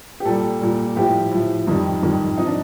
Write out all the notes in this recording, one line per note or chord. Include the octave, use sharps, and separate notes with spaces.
G4
A#2 G3 A4
A#2 G3
A2 F3 G4
A2 F3
F2 D#3 G3
F2 D#3 G3
C3 F3 D#4
D4